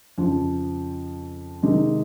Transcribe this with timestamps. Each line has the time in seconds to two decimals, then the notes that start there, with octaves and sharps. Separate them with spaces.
0.18 F2 C#3 F3
1.63 C3 D#3 G#3